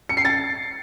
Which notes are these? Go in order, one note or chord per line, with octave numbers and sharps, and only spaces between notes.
C#7
C7
A6